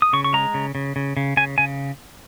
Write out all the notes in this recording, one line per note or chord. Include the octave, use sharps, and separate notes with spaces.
D#6
C#3 C#6
C#6
G#3 A#5
C#3
C#3
C#3
C#3
C#3 G#5
C#3 G#5